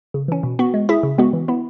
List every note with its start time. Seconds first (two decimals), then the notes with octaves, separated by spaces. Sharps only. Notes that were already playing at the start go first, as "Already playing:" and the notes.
0.14 C#3
0.28 E3 C#4
0.43 B2
0.59 B3 F#4
0.74 G#3
0.89 E4 G#4 E5
1.03 C#3
1.18 G#3 B3 F#4
1.33 E3
1.48 B3 E4